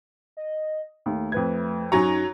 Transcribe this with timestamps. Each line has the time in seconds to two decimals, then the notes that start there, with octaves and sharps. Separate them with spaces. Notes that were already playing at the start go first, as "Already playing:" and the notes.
0.37 D#5
1.06 D#2 A3
1.32 F2 B4 G#6
1.92 F#2 F#3 D#4 G#5 A#5 C#6